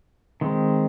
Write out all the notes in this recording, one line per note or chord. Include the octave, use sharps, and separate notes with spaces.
D#3 G#3 C4